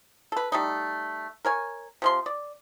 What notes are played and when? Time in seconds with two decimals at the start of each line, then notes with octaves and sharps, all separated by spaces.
0.32 A4 B4
0.52 G3 A3 D#4
1.45 A#4 C#5 G#5
2.02 C3 F3 C6
2.26 D5